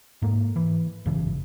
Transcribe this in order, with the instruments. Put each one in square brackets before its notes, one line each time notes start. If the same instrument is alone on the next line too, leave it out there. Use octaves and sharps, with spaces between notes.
[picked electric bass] G#2 A#3
E3
G#1 F#2 C#3 E3